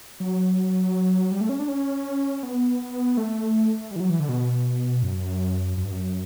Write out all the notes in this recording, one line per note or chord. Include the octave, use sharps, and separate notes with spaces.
F#3
G3
A3
C#4
D4
C#4
B3
A3
G3
E3
F#3
E3
D3
B2
F#2
F#2
G2
F#2